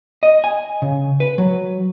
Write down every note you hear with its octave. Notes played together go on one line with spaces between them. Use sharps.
D#5
G#5
C#3
B4
F#3